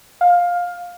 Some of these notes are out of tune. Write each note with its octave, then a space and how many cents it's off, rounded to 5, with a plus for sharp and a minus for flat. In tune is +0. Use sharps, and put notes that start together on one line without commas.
F5 +15